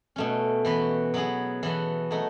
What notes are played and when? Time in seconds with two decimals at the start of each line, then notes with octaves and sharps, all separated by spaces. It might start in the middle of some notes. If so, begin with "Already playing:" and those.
0.16 B2 A3 C#4
0.65 E3 B3 F#4 B4
1.14 F#3 B3 E4 G#4
1.63 E3 B3 F#4 A4
2.11 F#3 A3 D#4